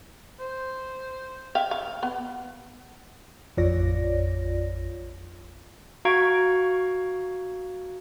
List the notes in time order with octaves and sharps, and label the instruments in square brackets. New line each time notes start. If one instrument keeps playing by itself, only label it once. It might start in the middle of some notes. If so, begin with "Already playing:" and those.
[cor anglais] C5
[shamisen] E5 F5 G5
F5
B3
[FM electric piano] A1 F2 F4 C#5 D5 A#6
[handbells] F#4 F5 A#5 C#6 G#6 D7